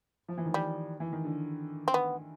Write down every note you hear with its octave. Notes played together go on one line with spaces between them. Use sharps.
F3
E3
D#3
G3
E3
D#3
D3
C4
B3